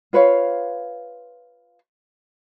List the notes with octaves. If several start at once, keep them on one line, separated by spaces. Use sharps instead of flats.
F4 B4 C#5 F5